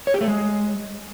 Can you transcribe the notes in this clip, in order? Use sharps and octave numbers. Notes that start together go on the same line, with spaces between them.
C#5
G4
A3
G#3